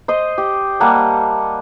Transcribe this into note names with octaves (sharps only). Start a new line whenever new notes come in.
C5 D#5
G4
G3 A#3 F#5 A5